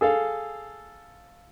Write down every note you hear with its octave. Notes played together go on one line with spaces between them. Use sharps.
G#4 A4 F5